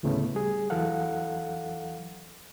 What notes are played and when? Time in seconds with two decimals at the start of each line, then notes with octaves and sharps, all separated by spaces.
0.03 D2 A2 C#3 A3 B3
0.35 G3 G#4
0.70 E2 E3 F#3 A4 F5 F#5